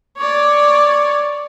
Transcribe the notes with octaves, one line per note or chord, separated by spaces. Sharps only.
C#5 D5